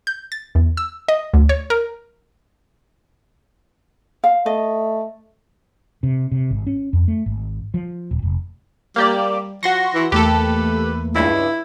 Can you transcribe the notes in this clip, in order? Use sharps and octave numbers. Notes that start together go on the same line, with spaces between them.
G6
A6
E2
E6
D#5
D2
C#5
A#4
F5
A3 D#5
C3
C3
G#1
C#4
F2
A3
G#1
F3
D#1
F1
G3 A#3 G4 D5
F3 F#4 C6 C#6 A#6
E3
E2 A3 A#3 G4 A4 B4
C#2 G2 E4